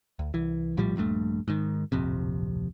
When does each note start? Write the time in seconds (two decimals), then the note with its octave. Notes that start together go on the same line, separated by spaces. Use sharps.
0.19 D2
0.34 C2 E3
0.77 A#1 A2 F3 G3
0.96 D#1 A#1 G2 A3
1.48 G#2 D#3
1.92 D1 A#1 F2 C3